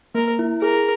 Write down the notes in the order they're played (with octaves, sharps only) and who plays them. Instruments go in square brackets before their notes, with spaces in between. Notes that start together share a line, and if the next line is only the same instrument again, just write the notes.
[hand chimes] A#3 [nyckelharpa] A#4
[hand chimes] E4
[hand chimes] G#4 [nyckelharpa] A#4